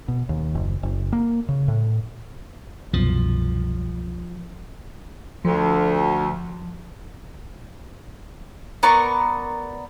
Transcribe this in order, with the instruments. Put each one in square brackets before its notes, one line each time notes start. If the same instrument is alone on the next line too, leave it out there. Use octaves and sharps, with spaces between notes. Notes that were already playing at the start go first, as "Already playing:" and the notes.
[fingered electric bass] B2
D#2
F#1
F#1
A#3
C#3
A2
[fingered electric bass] C2 F#2 B2 [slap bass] F3
[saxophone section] D2 [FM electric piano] F3
[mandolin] B3 A#4 D5 C#6